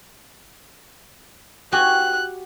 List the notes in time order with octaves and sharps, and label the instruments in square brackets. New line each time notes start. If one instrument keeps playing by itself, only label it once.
[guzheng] F#4 G4 G#5 [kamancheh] F#6